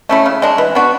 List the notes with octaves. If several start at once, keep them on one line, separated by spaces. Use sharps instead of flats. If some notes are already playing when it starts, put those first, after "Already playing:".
A3 C#4 E4
C#3
G#3 D4
E3
B3 D4 F#4